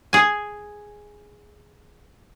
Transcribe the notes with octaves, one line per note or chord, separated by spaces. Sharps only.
G#4 G#5